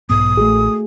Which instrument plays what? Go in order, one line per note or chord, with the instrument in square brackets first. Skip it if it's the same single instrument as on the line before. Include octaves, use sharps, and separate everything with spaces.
[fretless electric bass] B1 G#2 B3 [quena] D#6
[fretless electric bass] A1 [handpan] A3 F#4 G#4